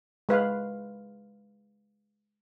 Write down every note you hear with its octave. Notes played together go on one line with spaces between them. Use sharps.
G#3 B4 F5